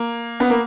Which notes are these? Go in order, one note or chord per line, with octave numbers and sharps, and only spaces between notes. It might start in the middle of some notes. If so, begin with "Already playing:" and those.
Already playing: A#3
B3
A#3